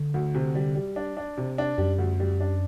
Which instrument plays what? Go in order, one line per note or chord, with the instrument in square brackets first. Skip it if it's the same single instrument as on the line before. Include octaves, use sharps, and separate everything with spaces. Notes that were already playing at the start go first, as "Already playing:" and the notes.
Already playing: [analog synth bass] D3
[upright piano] D2
C3
G3
G3
D4
D4
C3
D4
[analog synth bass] F#2 [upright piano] G3
[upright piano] D2
G3
D4